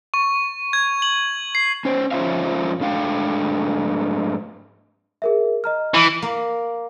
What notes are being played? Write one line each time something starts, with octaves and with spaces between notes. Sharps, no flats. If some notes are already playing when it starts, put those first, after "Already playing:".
C#6
G#6
F#7
C7
C#4 C5
F2 C#4 F4 C5 E5 F5
G#2 A3 D4 F5 G5
G#4 A#4 E5
D#5 A#5 F6
E3
A#3